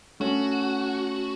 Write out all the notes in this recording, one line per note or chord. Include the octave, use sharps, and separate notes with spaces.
A3 C#4 F#4